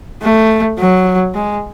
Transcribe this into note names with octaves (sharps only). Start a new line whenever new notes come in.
A3
F#3
G#3